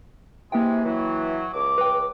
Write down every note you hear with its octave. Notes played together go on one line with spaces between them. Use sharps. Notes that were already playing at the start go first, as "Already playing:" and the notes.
C3 E3 G#3 A#3 G5
E3 F#3
C#2 D6
B4 G5